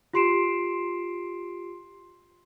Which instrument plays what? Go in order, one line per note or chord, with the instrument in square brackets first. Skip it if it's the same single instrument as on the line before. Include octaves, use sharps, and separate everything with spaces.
[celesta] F4 G4 C6 C7 D7 E7